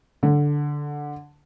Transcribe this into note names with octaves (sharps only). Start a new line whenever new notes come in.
D3